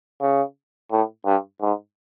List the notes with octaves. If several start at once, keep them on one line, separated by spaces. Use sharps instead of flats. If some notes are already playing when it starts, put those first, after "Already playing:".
C#3
A2
G2
G#2